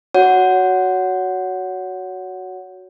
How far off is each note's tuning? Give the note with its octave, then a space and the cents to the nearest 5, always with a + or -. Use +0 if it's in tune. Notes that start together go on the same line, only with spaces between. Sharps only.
F#4 +0 C#5 +25 F#5 +0